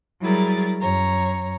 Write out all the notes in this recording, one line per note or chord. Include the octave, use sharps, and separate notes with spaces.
F#3 G3 E4 G#4 A#4 A6
F#2 C#5 A#5